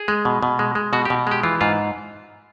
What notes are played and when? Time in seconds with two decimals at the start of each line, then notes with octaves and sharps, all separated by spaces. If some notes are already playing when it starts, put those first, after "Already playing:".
Already playing: G#4
0.08 G#3
0.25 B2
0.43 B2
0.59 G#3
0.75 G#3
0.93 B2 F#4
1.05 G4
1.10 B2
1.27 G#3 G4
1.43 E3 F4
1.61 G#2 F4